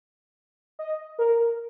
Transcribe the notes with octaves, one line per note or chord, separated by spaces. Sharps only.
D#5
A#4